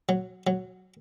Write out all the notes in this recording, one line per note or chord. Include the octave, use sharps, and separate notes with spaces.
F#3
F#3